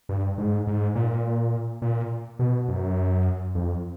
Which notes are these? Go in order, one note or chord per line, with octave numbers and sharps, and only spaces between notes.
G2
G#2
G#2
A#2
A#2
B2
F#2
F2